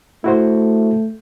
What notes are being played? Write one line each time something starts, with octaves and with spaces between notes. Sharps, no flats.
A3 E4 F#4 C5